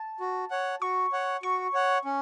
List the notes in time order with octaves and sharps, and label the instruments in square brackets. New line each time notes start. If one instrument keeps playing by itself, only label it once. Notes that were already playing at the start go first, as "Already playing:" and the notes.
Already playing: [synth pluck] A5
[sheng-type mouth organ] F#4
C#5 F#5
[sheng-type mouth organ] F#4 [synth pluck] C#6
[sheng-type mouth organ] C#5 F#5
[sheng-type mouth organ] F#4 [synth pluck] C#6
[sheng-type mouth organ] C#5 F#5
C#4